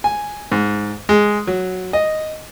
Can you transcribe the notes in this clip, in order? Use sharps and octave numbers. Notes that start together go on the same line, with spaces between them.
G#5
G#2
G#3
F#3
D#5